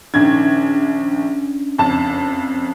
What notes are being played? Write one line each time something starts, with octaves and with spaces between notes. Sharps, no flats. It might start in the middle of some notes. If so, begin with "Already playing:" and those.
A#1 D#3 C#4 D4 G#6
F#1 F2 A5